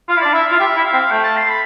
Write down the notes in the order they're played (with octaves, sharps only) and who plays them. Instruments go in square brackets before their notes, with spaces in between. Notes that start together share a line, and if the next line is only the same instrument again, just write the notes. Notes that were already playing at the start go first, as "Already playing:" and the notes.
[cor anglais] F4 [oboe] F5
[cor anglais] E4
[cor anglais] D4 [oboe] D5
[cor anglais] E4 [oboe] E5
[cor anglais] F4 [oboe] F5
[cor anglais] G4 [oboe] E5
[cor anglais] E4
[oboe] F5
[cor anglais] C4
[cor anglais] A3 [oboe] G5
[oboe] A5
C6
B5